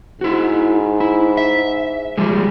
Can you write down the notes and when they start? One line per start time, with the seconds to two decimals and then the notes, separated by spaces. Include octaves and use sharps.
0.21 G#2 E4 F#4
1.00 E4
1.37 E5
2.18 F3 G3 G#3